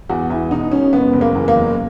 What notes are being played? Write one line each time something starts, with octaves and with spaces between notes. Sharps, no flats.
E2 F#4
E2 E4
B2 D#4
E1 C#4
F#1 B3
F#1
A#3
E2
A#3
F#1